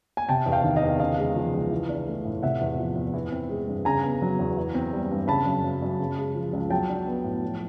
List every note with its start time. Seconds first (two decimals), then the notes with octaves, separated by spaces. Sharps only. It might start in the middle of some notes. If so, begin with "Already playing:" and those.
0.17 G#5
0.29 C3 G5 A5
0.46 E2
0.52 F5 G5
0.64 D#3
0.76 D#5 F5
0.83 E2
0.99 C#3 D#5 F5
1.18 G#3
1.36 F3
1.54 C#2
1.71 E3
1.89 D4
2.06 A3
2.25 A2
2.42 C3 E5 F#5
2.61 E2
2.78 F3
2.96 E2
3.14 E3
3.32 C4
3.49 G#3
3.68 G2
3.85 C#3 G#5 A#5
4.03 B3
4.22 F#3
4.39 E2
4.57 E3
4.74 C4
4.93 G3
5.11 G2
5.28 C#3 A5 B5
5.46 F#2
5.64 F#3
5.82 F#2
5.99 C#3
6.17 G#3
6.35 F3
6.53 C#2
6.70 F#3 G5 A5
6.89 D4
7.07 B3
7.24 A2
7.42 F3